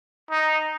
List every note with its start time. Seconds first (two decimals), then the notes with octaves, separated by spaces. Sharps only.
0.31 D#4